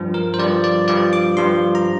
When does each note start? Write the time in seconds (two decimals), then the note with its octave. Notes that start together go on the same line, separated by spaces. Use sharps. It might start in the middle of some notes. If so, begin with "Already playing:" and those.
Already playing: G2 F3
0.14 A#4
0.34 C5
0.39 G2 F3 D5
0.64 D5
0.88 G2 F3 D5
1.13 D6
1.37 G2 F3 C6
1.75 A#5